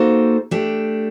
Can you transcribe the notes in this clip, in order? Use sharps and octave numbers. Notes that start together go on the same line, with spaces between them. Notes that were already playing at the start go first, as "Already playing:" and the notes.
Already playing: A#3 D#4 F#4 A4 C5
A3 D4 G4